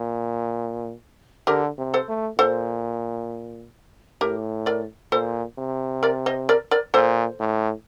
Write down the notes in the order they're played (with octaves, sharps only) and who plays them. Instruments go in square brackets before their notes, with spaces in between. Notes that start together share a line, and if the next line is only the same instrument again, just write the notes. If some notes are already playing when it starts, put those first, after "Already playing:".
Already playing: [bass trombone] A#2
[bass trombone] D3 [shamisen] G4 A#4
[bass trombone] C3
[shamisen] A4 C5
[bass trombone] A3
[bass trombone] A#2 [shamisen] A4 C5
[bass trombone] A2 [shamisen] G4 A#4
[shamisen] A#4 D5
[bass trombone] A#2 [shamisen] A4 C5
[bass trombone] C3
[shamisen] A#4 D5
C5 D#5
A#4 D5
A#4 D5
[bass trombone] A#2 [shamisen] A4 C5
[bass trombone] A2